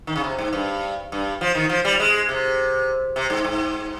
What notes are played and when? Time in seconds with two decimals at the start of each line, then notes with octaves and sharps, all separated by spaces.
0.07 D#3
0.16 C#3
0.24 C3
0.38 G#2
0.53 G2
1.12 G2
1.41 F3
1.55 D#3
1.69 F3
1.85 G3
2.00 G#3
2.29 C3
3.16 C3
3.30 G#2
3.45 G#2